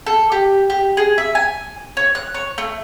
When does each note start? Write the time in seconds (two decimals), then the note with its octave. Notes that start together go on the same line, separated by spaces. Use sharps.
0.06 A4
0.32 G4
0.70 G4
0.97 G#4
1.18 E5
1.35 G#5
1.97 C#5
2.15 F#6
2.34 C#5
2.58 A3